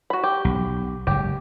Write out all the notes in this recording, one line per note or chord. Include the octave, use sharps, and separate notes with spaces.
F#4 B5
G4
B1
F#1 G#2 G4